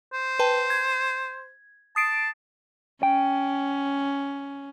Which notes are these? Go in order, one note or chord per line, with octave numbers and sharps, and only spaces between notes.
C5
B4 G5 A5
G#6
A5 D#6 C7 D7
C#4 G5